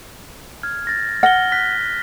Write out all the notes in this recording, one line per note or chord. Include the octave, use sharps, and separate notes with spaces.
F6 G#6
A6 A#6
F#5 F6 A#6 G7
F6 F#6 B6